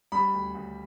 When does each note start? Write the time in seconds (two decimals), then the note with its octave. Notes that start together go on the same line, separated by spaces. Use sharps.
0.12 G3 B5
0.34 D2
0.55 D2